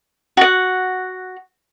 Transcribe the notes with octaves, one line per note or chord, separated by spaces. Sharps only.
F#4 F#5